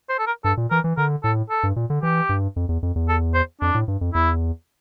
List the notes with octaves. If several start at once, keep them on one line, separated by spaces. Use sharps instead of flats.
C5
A4
A#4
G2 A4
A#2
E3 A#4
E3
D3 A#4
A2 A4
A4
G2
A#2
D3
E3 G4
G2
F2
E2
F2
E2
A4
C5
F2 D4
A2
G2
F2
E2 E4